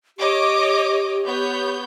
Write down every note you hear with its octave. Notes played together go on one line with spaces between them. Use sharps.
G4 C#5 D#5 D6
B3 C#5 G6